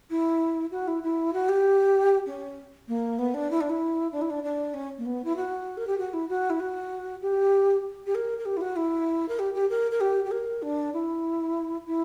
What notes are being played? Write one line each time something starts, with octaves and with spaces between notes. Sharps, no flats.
E4
F#4
E4
E4
F#4
G4
C#4
A#3
B3
D4
E4
D4
E4
D4
E4
D4
D4
C#4
A#3
B3
E4
F#4
A#4
G4
F#4
E4
F#4
E4
F#4
G4
G4
A#4
A#4
G4
E4
F#4
E4
A#4
G4
G4
A#4
A#4
G4
G4
A#4
D4
E4
E4